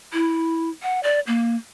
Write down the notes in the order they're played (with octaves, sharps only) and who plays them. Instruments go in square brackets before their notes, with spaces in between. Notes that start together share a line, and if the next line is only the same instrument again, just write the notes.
[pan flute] E4
F#5
D5
A#3